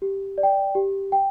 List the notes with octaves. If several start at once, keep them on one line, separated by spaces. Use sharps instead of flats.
G4
D5
G5
G4
G5